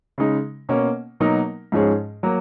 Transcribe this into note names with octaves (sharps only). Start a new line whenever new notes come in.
C#3 G#3 D#4
B2 A#3 C#4
B2 F#3 A#3 D#4 A#4
G#2 F3 G#3 C#4 G#4
F#3 A#3